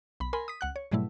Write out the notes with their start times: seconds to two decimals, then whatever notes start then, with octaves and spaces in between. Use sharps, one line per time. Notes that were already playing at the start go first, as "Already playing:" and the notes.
0.20 B1 B5
0.33 A#4 G#5 B5 C6
0.48 D#6 B6
0.61 C#2 F#5 F#6
0.76 C#5
0.92 G#2 B2 F#3 G3 A3 E4